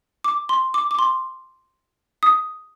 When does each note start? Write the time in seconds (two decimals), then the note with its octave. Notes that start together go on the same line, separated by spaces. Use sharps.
0.24 D6
0.49 C6
0.74 D6
0.91 D6
0.99 C6
2.23 D#6